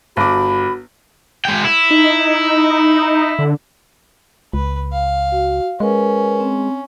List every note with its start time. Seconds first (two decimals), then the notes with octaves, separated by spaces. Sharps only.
0.17 G1 F#4 B5 D6
1.45 G#3 G5
1.64 E4
1.91 D#4
3.39 D3
4.53 C#2 B4
4.92 F5
5.32 F#4
5.80 G#3 C#4 A#4 B4 G#5
6.40 C4